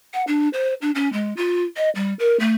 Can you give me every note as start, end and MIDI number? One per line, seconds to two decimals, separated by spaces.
0.14 0.23 78
0.27 0.49 62
0.53 0.74 72
0.82 0.91 62
0.95 1.12 61
1.13 1.33 56
1.37 1.64 65
1.77 1.90 75
1.95 2.14 55
2.19 2.37 70
2.40 2.56 57